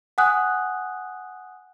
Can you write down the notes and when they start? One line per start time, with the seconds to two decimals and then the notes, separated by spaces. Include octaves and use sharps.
0.18 F#5 G#5 D#6 F#6